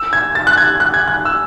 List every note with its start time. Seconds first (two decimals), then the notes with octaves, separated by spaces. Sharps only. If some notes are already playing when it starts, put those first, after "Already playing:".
Already playing: E6
0.13 G#6
0.35 A6
0.47 F#6
0.58 G#6
0.80 F#6
0.94 G#6
1.08 F#6
1.25 E6